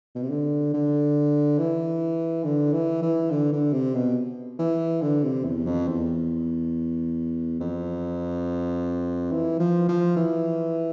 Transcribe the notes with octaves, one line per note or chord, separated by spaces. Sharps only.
B2
C3
D3
D3
E3
D3
E3
E3
D3
D3
C3
B2
E3
D3
C3
E2
F2
E2
F2
E3
F3
F3
E3